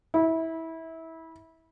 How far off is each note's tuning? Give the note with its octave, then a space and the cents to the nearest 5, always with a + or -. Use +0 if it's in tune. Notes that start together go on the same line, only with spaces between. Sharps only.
E4 -25